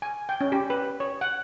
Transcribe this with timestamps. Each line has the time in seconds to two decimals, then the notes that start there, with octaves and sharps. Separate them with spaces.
0.02 G#5
0.29 G5
0.41 C#4
0.52 G4
0.70 B4
1.00 C#5
1.21 F#5